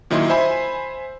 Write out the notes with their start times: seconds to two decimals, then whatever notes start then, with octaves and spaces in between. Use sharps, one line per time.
0.10 A#2 D#3 F#3 E4 D#5 C6
0.30 C5 E5 G#5 B5